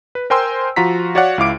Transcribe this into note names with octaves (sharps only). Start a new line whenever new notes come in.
B4
A#4 C5 G5 G#5 C6 E6
F3 F4 F#4 A#5 B6
F#4 C#5 D5 F5 F#5
C#2 E4 F5 D6 D7